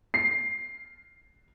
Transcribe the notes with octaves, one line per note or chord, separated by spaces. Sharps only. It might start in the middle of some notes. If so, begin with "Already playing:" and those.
C7